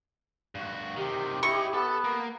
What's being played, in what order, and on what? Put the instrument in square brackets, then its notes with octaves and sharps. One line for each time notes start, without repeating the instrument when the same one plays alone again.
[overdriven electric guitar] G2 F#4
[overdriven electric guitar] C3 D#3 [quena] G4
[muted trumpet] E4 [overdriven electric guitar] C#5 D#5 [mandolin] C#6
[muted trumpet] B3 [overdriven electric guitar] A4
[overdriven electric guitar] A#3